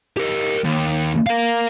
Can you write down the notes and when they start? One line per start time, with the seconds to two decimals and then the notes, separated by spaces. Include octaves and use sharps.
0.17 G4 A#4
0.64 D#2
1.26 A#4 F5